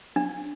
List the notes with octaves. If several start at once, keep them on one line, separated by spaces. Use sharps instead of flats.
D4